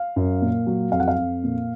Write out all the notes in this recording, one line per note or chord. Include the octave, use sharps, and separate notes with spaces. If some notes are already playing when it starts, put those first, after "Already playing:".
Already playing: F5
F#2
A#2
F#3
F2 F5
F#5
F5
F2
A#2